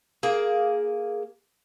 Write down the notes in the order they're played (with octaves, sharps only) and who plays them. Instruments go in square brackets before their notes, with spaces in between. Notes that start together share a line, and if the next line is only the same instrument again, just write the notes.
[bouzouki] A#3 G#4